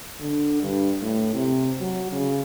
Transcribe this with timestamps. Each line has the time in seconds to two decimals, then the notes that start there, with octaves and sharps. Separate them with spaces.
0.20 D3
0.62 G2
1.02 A2
1.34 C3
1.80 F#3
2.12 C#3